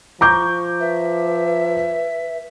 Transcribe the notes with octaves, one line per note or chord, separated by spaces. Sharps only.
F3 A#5 C#6 D6 G6
B4 E5